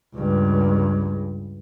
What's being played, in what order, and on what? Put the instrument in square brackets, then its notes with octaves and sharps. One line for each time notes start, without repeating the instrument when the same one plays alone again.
[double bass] C#2 G2